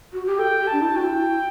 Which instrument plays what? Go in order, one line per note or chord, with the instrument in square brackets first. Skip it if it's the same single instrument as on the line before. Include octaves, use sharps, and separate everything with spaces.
[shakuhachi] F#4
G4
[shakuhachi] A4 [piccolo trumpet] G5
[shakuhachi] G4
[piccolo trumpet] A5
[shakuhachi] D4
E4
[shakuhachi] F#4 [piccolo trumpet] G5
[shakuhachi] E4